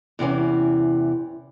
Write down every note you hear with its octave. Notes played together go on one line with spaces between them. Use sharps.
E2 C3 E3 C#4